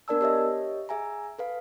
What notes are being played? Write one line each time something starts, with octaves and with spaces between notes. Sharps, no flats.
B3 D4 A#4 D5 A5 E6
G4 C#5 D#5 E5
G#4 E5 G#5 A#5
A4 B4 F5